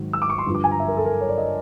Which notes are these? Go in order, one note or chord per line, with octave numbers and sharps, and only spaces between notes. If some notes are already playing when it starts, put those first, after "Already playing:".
Already playing: G#2 D#3 F#3
E6
D6
C#6
C6
G2 D3 F3
D6
G#5
A#5
E5
A#4
A4
A#4
C#5
D5
D#5